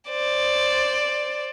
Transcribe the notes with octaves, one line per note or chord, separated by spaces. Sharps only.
C5 D5